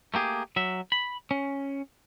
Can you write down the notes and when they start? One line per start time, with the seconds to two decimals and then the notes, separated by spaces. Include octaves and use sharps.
0.14 A3 A#3 G4 G#4
0.56 F#3 E5
0.92 B5
1.31 C#4